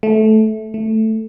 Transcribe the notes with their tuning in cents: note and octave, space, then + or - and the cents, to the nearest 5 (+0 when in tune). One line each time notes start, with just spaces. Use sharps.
A3 -15
A3 +5